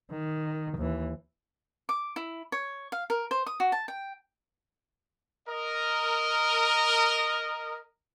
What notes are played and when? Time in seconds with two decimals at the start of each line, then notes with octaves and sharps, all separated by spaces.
0.11 D#3
0.77 D#2 E3
1.89 D6
2.16 E4
2.52 C#5
2.92 F5
3.10 A#4
3.31 C5
3.46 D#6
3.60 F#4
3.72 A5
3.88 G5
5.48 A#4 D#5